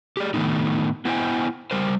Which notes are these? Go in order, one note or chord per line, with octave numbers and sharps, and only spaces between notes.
G4 G#4 D5
A2 D#3 F3 A3 B3 D#4
B3 E4 C5 D#5 G5 G#5
G3 A#4 C5